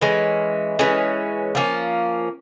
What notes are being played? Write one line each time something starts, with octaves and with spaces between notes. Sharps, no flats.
E3 G#3 C#4
E3 G#3 C#4
F3 A#3 C#4